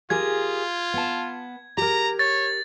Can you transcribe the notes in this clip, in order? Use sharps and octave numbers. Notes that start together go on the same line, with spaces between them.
F4 G4 G#4 A#4 G#6
B3 A5
G4 A#4 A#5
C#5 A6